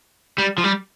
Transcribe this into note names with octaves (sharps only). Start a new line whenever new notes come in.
G3
F3
G3